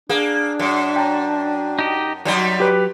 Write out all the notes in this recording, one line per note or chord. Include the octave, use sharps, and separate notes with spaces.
A#3 D4 G#4
F#2
G5 A5 A#5
D#4 G4 D#5
F#2 F#3 G3 D#4
G4 B4